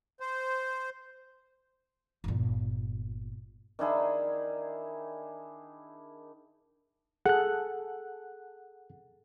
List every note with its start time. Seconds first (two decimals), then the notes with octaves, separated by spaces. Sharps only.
0.20 C5
2.24 G1 A#2
3.79 D#3 D4 E4 G#4
7.26 G#4 A4 F#5 F#6